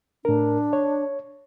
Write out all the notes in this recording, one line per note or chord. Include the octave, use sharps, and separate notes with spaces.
A2 D4 A#4
C#5